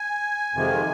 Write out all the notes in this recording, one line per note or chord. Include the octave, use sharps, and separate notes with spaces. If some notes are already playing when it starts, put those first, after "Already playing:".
Already playing: G#5
F2 C3 D#3 G#3